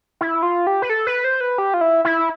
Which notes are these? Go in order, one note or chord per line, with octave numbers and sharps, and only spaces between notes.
E4
F4
G4
B4
A4
B4
C5
B4
G4
F4
E4
E4